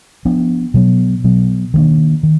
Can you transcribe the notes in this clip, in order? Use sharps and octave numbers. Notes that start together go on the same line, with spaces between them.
F3 B3 D4
B2 F#3 B3
B2 F#3 B3
D#3 F#3 A#3 D4
D#3